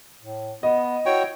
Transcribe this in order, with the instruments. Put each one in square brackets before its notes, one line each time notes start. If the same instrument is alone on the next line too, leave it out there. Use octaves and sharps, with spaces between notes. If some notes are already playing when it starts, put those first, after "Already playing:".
[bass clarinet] A2
[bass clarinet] B3 [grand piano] D#5
[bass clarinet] E4 [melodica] F#4 C#5 G5